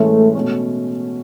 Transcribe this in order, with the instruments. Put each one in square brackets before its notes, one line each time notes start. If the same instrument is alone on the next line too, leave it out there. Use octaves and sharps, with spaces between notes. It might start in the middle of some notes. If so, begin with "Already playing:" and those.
Already playing: [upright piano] A2 E3 G#3 C#4 [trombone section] A3
[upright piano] B2 A3 C#4